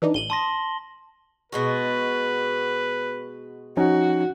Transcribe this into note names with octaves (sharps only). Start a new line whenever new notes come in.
E3 D4 D#4
A1 D#7 F#7 G7
A5 C6 D#6 A#6
B2 G#3 F#4 B4
F3 C#4 D#4 F#4